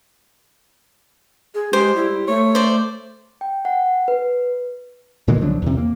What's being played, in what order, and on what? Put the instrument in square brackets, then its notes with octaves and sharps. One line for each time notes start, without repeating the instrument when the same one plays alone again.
[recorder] G#4
[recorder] G#3 [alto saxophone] G4 [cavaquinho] C5
[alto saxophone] G3 [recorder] E4
[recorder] A3 [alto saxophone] C#5
[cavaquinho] C5 D5
[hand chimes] G5
F#5
B4
[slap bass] A#2 D3 E3 G#3
C2 F3 F#3 D4
E2 C3
A#3